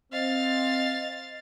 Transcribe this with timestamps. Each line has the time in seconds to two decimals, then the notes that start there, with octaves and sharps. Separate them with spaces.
0.12 C4 D#5 F5 A6